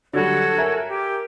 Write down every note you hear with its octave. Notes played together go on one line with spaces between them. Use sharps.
D3 F#3 G3 F#4 A4 C#5
A#4 E5 G#5
G4